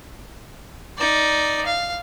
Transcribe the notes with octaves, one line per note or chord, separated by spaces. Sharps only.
D#4 D5
F5